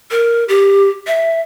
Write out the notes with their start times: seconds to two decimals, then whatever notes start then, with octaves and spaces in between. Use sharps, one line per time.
0.11 A#4
0.49 G4
1.07 E5